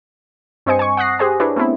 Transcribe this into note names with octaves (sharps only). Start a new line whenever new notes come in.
G2 C4 C5 D#5 G#5 C#7
G#5 C#6
F#5 D#6 F#6 A#6 C7
G4 G#4 C5 G#5
D4 E4 B4 C#5
A3 B3 C4 E4